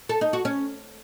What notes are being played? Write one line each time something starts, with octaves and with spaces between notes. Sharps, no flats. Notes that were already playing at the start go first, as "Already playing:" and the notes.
A4
D#4
F#4
C#4